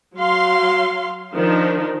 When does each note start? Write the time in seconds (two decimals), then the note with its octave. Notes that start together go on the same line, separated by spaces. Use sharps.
0.17 F#3 F5 C6
1.35 D#3 F3 D4 D#4